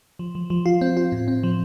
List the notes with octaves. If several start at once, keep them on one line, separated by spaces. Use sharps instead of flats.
F3
F3
F3
F4
C4
F4
A2
C4
F3